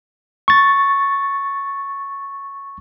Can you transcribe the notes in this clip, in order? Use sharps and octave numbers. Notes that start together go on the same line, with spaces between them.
C#6 A6